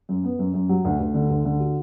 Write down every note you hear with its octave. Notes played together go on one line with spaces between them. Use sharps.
F#2
B3
F#2
F#2
F#3
D2
D2
D3
D2
D3
F#4